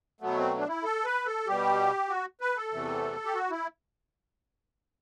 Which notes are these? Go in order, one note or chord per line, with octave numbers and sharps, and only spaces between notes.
B2 F#3 A3 B3
C4
D4
E4
A4
B4
A4
B2 G3 G4
F#4
B4
A4
E2 C3 E3 A3
G4
F#4
E4